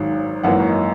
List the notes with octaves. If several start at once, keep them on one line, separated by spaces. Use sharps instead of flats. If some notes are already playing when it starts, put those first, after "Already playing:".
Already playing: G#1 G#2 D#3 F#3
G#1 F#2 E3 A#3 F#5
C#5
D#5